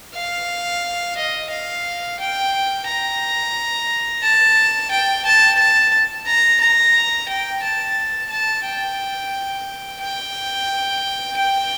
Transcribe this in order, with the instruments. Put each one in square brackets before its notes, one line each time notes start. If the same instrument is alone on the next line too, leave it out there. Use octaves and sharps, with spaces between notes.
[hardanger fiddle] F5
D#5
F5
G5
A#5
A5
G5
A5
A5
A#5
A#5
G5
A5
A5
G5
G5
G5